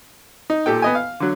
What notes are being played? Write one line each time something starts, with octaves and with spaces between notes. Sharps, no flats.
D#4
A#2 G4 A4 G5
B3 D#5 G#5
F5
D3 F#3